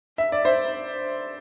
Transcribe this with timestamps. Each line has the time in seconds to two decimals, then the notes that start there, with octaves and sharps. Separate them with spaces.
0.18 E5
0.32 D5
0.45 C5 E5